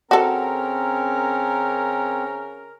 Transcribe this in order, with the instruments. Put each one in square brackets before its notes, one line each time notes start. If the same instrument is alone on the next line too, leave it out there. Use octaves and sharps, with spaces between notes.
[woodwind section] C#3 C#4 A#4 [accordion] C4 [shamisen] F#4 A4